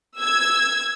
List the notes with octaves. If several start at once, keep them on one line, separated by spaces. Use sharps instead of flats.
E6 G#6